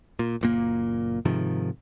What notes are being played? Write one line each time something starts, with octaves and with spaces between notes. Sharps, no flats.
A#2
F#1 A#2 A#3
G#2 C3 D#3 F3